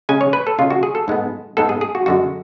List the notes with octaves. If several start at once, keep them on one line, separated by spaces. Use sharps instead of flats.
C#3 G#3 C#4 G#5
C#5
B4
A4
C#3 G#3 C#4 F4
F#4
G#4
A4
G#2 G#3 B3
G#2 G#3 B3 A4
G#4
G#4
F#4
F#2 D3 G#3 F#4